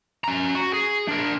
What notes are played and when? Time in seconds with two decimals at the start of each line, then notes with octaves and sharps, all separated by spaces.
0.24 C#4 A#5
0.55 F#4
0.73 G#4
1.08 D4 A#4